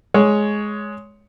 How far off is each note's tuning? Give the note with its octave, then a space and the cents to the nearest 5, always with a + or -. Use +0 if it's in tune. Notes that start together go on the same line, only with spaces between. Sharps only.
G#3 +10 C#5 +10